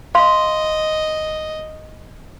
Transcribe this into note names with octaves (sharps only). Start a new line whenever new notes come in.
D#5 F5 C6